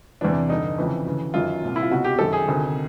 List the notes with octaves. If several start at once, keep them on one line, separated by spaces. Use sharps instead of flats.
E2 C3 E3 D4
G2 D3 D#4
F2 C#3 E3
D2 C#3 E3
F#2 D#3 F4
C2 A#2
E4
F4
C#2 B2 F#4
G4
F#2 D#3 A4
G#4
D2 C3 D#3